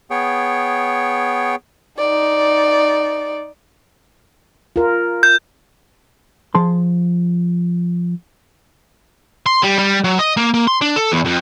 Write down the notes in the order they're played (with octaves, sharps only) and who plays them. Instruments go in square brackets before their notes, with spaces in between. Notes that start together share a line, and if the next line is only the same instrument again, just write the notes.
[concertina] B3 G#4 C#5 G5
[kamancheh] D#4 D5
[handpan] F4 A#4
[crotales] G6
[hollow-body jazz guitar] F3 G#4 A5 C6
[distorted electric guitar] C6
G3
G3
F#3
D#5
A#3
A#3
C6
D4
A4
E2
F2